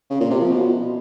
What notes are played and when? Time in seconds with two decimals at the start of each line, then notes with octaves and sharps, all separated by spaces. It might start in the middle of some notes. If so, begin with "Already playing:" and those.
0.10 C#3
0.20 A#2
0.30 C3
0.40 F3
0.50 B2